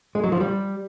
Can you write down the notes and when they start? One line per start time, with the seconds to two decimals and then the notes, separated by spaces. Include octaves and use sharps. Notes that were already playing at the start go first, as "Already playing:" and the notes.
0.15 G#3
0.24 F#3
0.32 F3
0.41 G3